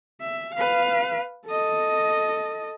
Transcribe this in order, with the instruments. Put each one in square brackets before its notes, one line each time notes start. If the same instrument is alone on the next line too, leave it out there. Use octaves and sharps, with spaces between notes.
[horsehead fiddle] E5
B4 F5
A4 D#5